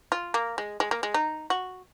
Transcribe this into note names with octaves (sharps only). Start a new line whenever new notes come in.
F4
A#3
G#3
G#3
A#3
G#3
D#4
F#4